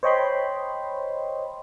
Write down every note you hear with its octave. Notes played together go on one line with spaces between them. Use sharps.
C5 C#5 D#5 G5 B5 C6